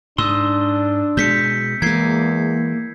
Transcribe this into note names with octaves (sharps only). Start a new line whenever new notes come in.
G#2 D4 C6 D#6 E6
B2 G#3 G6 B6 C#7
E2 E3 G#3 A#3 G#6 C7